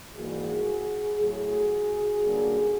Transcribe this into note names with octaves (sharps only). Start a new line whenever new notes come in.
G#2 E3 G3 A#3 F#4 G#4
A2 F#3 A3 F#4 G#4
F#2 D3 G3 A#3